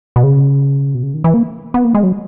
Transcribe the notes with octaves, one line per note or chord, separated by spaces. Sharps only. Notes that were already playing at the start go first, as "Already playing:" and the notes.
B2
C#3
B2
C#3
D#3
E3
A#3
B3
A#3
G#3
F#3